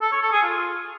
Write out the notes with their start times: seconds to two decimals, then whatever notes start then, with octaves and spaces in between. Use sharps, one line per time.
0.01 A4
0.12 C#5
0.22 A4
0.32 G#4
0.42 F4